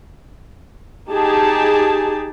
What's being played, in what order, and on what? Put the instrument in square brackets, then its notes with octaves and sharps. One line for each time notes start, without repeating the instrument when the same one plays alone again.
[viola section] D#4 G4 G#4 A5